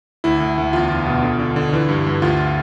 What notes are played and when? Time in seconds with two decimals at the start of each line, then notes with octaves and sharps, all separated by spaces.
0.24 D2 E4
0.40 D2
0.58 D2
0.73 E2 F4
0.90 E2
1.06 B2
1.23 D3
1.39 D3
1.56 D3
1.73 E3
1.89 G2
2.06 G2
2.22 D2 F4